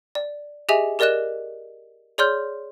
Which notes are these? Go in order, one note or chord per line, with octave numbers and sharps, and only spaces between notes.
D5
G4 G#4 D#5 E5 G#5 F7
G4 A#4 D5 D#5 F#6 E7
G#4 C#5 D5 C6 F6 G6